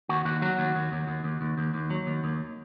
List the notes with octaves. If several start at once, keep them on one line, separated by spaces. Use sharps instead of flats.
D#2 F#4
D#2 F#4
F#3 F#4
D#2
D#2
D#2
D#2
D#2
D#2
D#2
D#2
F#3
D#2
D#2